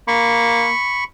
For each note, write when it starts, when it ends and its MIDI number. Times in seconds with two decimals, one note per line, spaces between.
0.08 0.70 58
0.08 1.04 83
0.08 1.04 85